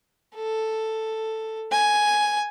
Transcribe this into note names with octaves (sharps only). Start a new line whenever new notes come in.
A4
G#5